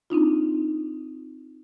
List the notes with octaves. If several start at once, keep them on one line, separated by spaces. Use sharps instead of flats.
C4 D4 D#4 F4